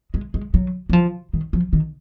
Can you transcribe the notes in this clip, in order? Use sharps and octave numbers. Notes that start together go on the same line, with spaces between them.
G#3
G#3
F#3
F#3
F3
D#3
F3
D#3